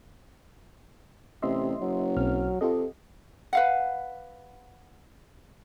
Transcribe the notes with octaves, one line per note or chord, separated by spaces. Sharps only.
A1 C3 D#5 E5 C6
F#1 F#3
B1 C4 F6
C3 F4 G4 A4 D#5
B4 F5 F#5